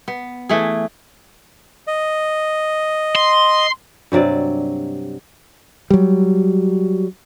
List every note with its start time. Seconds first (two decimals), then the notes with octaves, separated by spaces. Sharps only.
0.08 B3
0.49 E3 A3 G#4
1.87 D#5
3.16 C6
4.12 G2 C3 F#3 D5
5.90 F#3 G3